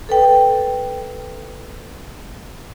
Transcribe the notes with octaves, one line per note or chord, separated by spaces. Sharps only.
A4 B4 G5